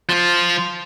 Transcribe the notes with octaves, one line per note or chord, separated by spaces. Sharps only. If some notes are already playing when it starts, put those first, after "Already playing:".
F3 F4